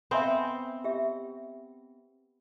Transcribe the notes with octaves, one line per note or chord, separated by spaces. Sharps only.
B3 C4 C5 E5 F5 G#5
G4 E5